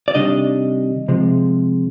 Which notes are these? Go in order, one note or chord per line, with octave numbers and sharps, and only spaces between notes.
D5
C3 D#3 G3 D4 D#5
C3 F3 G#3